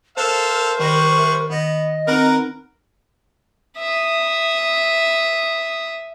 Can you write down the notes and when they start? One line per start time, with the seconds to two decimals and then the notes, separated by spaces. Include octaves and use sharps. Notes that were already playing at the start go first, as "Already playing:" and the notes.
0.18 A4 A#4 C5 E5 F5 F#6
0.79 D#3 G3 B4 C#6 A#6
1.18 E5
1.50 D#3 B3 D#5 A#6
2.07 C4 D#4 A#4 B4 F#5
3.78 E5 D#6